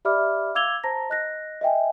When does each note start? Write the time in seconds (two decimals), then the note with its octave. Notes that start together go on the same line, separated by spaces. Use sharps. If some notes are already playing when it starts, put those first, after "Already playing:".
0.05 G4 D5 E5 B5 D6 F6
0.55 F5 D6 E6 G#6 F7 G7
0.84 C5 A5 A#5 A#6
1.10 D#5 F#6 A#6
1.61 D#5 E5 G5 G#5